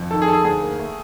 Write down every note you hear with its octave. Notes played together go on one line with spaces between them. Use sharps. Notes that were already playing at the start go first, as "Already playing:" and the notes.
Already playing: F2
D#3 A4
G#4
D#3 A4
G#4
D2 G#4
A#3
A3